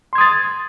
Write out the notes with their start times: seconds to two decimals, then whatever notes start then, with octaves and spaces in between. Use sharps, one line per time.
0.13 C6
0.15 G#6
0.18 D#6
0.21 A6